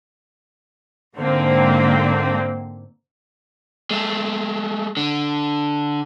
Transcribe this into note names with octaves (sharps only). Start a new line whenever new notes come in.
G#2 D3 A#3 C4
G#3 A3
D3